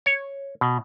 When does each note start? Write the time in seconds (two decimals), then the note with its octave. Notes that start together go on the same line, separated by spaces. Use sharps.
0.06 C#5
0.61 B2